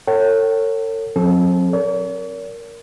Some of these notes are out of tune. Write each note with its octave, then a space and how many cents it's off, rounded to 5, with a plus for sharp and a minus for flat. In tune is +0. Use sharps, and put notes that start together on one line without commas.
A4 +45 C#5 -15 G5 -45
F#3 -40 C4 +30 A4 -30
A#4 +0 C#5 +45